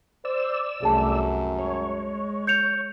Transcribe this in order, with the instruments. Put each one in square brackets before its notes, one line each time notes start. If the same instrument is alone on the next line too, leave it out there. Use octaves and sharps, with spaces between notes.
[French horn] C5 [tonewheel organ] D5 E6
[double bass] C2 A3 [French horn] F#2 [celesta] G#4 A5
[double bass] G#3 [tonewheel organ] C#5
[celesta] G6 C#7 F7